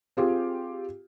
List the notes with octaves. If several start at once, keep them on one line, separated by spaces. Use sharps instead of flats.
C4 F4 G4 G#4